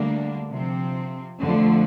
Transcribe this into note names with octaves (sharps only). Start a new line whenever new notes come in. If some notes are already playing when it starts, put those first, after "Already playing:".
Already playing: D2 D3 G3 A#3 D4
C3 F3 C4
F2 D3 F3 A3